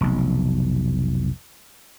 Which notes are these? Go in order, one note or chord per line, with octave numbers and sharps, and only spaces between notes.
F1 B1